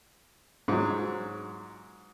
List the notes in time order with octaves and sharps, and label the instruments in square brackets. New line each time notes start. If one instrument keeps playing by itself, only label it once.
[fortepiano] G#2 F#3